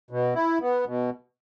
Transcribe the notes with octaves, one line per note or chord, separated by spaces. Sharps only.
B2
E4
B3
B2